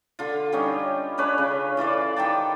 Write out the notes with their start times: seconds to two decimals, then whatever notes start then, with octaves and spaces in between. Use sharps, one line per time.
0.19 D3 F4
0.52 G3 C#4 D#4
1.18 C#4 D4 B4 C#5
1.38 C#3
1.77 E3 F4 A4 D5
2.16 D#3 G4 G5 A5